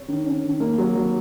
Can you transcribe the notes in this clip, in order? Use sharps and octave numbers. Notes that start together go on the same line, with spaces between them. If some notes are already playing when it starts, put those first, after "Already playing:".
Already playing: C#5
D#3
C#4
D#3
A#3
F#3
F#3